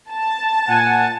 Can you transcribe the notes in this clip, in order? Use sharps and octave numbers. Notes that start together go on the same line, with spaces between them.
A5
A#2 F#5 G#5